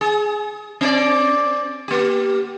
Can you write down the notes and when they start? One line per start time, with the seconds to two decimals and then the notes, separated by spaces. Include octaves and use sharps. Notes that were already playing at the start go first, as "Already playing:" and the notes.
0.01 G#4
0.81 C4 D5
1.88 A#3 G4